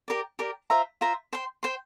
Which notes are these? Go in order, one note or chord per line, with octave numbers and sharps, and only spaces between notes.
G4 A#4 D5
G4 A#4 D5
F4 C5 E5 A#5
F4 C5 E5 A#5
C5 G5 C6
C5 G5 C6